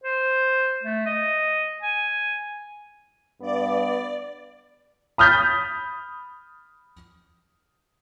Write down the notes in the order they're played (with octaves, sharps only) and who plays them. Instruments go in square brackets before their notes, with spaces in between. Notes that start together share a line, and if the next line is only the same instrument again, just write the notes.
[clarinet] C5
A3
D#5
G#5
[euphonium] G2 [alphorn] B3 [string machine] D5
[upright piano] B5 D#6 F6 G6 A6 B6